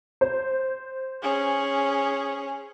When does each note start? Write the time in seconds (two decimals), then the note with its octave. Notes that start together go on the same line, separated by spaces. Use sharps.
0.21 C5
1.22 C#4 G#4